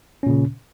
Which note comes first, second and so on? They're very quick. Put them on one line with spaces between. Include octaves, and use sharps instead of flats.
C#4 A#2 C#3